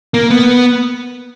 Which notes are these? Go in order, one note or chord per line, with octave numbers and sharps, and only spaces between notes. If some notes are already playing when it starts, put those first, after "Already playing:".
A#3
B3